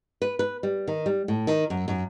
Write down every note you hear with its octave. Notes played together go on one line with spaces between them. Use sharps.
B4
B4
G3
D#3
G3
A2
D#3
F#2
F#2